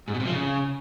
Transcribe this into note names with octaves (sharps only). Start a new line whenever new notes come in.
G#2
B2
C3
F3
C#3